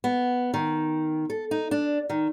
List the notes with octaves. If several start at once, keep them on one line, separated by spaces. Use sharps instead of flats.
B3
D#3
A4
D#4
D4
D#3